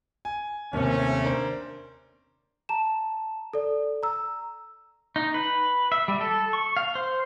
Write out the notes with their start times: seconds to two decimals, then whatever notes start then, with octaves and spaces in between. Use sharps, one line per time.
0.25 G#5
0.73 D#2 C3 A3 C#4
1.23 D4 A#4 C5
2.69 A5 A#5 E7
3.53 A4 D5
4.03 A#5 E6
5.16 D#4
5.34 B4
5.92 E5
6.08 G3
6.21 A4
6.53 C#6
6.77 F5
6.95 C5